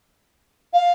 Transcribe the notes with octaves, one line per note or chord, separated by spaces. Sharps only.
F5